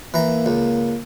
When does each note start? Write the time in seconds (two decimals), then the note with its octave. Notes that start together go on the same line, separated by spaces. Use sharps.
0.14 E3 A#3 A#5
0.46 C#2